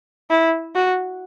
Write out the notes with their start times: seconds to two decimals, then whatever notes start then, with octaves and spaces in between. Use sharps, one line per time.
0.30 E4
0.75 F#4